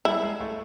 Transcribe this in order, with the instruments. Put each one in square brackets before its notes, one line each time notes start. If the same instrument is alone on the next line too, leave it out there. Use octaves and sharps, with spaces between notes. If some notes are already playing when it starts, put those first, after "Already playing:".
[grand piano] G3 [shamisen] E4
[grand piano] G#3
A3